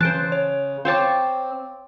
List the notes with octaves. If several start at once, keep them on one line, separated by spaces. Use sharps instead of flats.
C#3 E3 C5 A5 F#6 D7
C#5
C4 C5 C#5 F5 G5 A5 D6